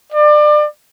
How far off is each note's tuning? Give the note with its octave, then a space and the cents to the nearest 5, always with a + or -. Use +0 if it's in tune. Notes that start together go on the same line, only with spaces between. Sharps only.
D5 +30